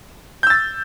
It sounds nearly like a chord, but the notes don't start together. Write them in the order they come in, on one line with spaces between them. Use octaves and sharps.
G6 E6 A6